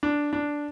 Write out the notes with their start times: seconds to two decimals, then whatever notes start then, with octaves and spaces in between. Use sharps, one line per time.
0.03 D4
0.33 D4